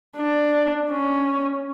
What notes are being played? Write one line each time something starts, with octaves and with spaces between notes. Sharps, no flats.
D4
C#4